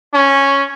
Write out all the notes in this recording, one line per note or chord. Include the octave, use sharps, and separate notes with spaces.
C#4